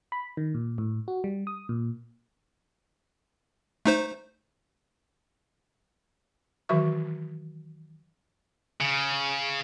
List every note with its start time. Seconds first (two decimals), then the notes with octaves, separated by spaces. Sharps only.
0.12 B5
0.37 D#3
0.54 A#2
0.78 A2
1.08 F#4
1.24 G3
1.47 D#6
1.69 A#2
3.85 A3 D#4 C5
6.69 D#3 E3 F#3 F#4 E5 C#6
8.80 C#3